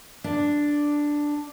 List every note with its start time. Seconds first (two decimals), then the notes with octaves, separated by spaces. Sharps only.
0.24 D4